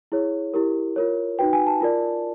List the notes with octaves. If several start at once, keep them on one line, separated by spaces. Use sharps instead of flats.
E4 G#4 C#5
E4 G4 A#4
F4 A#4 C#5
D#4 F#4 B4 G5
G#5
A5
F4 A#4 D5